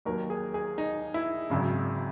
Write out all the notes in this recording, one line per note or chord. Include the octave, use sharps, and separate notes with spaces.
D#2 D#3 F#3 A#4
G#4
G#4
D#4
E4
G#1 F#2 C#3 F#3